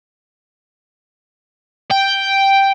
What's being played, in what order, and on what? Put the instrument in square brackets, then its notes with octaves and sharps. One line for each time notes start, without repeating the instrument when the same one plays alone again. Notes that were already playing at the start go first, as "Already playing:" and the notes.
[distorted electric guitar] G5